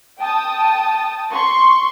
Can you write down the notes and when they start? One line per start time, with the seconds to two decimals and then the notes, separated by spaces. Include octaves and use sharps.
0.18 G5 A5 D#6
1.32 C6 C#6